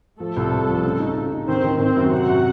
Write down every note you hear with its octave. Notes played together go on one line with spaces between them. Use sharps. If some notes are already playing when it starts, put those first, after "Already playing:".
F3 A3 A4
C2
C2
F3
C#3
D#4
C#3
D#4
D#3 C4 C5
D#3
D#3 C4 C5
F#2
C3 F#4 F#5
C3